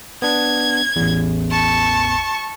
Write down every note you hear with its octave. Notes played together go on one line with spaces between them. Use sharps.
B3 D4 G#6
A1 E2
A5 C#6